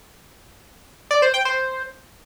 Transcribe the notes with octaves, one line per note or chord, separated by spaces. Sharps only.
D5
C5
G5
C5